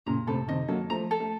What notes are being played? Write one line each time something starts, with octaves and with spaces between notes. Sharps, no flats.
A#2 C#3 A#5
A2 C3 A4
C3 D#3 D#5
F#3 A#3 A4
F3 A3 A#5
A4
A3